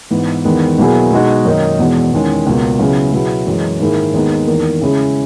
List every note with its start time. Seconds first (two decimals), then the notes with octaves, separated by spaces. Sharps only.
0.11 G#2 E3 B3
0.45 E2 D#3 G#3 B3
0.78 B2 F#3 A#3 E4 G#4
1.12 B2 G#3 D#4 F#4
1.45 F#2 D#3 A#3 D#4
1.79 E2 B2 G#3
2.13 E2 D#3 G#3 C#4 G#4
2.46 C#2 B2 A#3
2.79 C#3 F#3 B3 E4 G#4
3.13 B2 F#3 B3 E4 G#4
3.47 F#2 E3 G#3
3.80 G#2 D#3 A#3 E4 G#4
4.13 D#2 D#3 G#3 B3 D#4
4.47 E2 D#3 A#3
4.82 C#3 G#3 C#4 E4 G#4